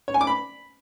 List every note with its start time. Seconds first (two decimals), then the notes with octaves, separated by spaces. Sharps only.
0.08 C#5
0.14 G#5
0.21 D6
0.27 B5